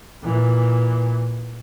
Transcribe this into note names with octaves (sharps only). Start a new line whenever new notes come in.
A#2 E3